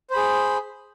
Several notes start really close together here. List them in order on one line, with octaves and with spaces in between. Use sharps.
C5 B5 G#4